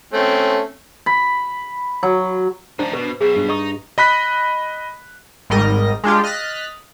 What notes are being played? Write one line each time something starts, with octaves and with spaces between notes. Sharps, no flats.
A3 C4 C#4
B5
F#3
F3 D4 D#4 C5
B2 B4
B1 B2 G#4 E5
G2
D#4 D#5 C#6 D#6
D#5 B5 F#6 B6
G#1 G#2 G3 A#4 D#5 A#6
G#3 D4 F4 G4
D#5 F6 F#6 A6 B6